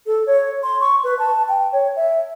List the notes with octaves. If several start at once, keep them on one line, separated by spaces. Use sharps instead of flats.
A4
C#5
C6
C#6
B4
A5
G5
C#5
E5